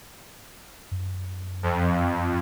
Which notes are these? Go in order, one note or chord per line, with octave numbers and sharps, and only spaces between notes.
F#2
F2